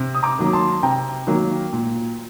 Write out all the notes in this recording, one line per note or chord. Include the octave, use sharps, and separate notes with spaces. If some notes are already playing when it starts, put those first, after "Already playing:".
Already playing: C3
D#6
A#5 D6
D#3 F#3 A#3
A5 C6
C3 G5 A#5
D#3 F#3 A#3
A#2